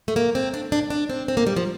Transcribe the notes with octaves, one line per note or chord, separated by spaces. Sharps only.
A3
A#3
C4
D4
D4
D4
C4
C4
A#3
G3
F3